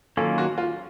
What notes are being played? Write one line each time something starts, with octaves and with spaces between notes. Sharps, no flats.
D#3 F#3 A#3 C#4 F4 A4
F#4
F4